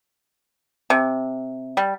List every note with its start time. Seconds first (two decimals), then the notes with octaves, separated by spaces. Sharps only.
0.90 C3
1.77 G3